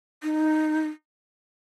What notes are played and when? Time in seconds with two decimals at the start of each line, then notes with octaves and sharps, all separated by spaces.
0.23 D#4